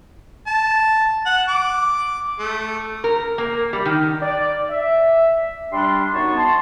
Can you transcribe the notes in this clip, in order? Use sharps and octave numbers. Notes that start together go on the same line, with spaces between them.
A5
F#5
D6
A3
A#4
A#3
G3
D#3
D5
E5
G3 D4 C6
F#2 B3 D#4 C#5 A5 C#6
A5 C6